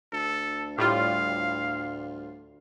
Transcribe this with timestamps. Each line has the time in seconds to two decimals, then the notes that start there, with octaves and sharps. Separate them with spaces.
0.12 D2 A4
0.78 A2 G3 F4 F5